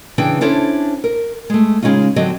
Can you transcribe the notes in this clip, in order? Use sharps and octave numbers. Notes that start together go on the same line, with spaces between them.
C#3 E3 D4 B4 G5
C#4 D4 E4 A4 C5 C#5
A#4
G#3 A3
C#3 G#3 C#4 D#4 F4
D3 F#3 C4 D#5